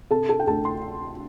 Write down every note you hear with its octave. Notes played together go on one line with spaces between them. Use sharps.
C3 A4 A5
A4 A5
G5
D2 A4 A5
C6